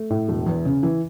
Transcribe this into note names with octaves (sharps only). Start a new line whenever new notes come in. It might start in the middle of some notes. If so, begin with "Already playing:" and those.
Already playing: A3
A2
E1
E2
C#3
E3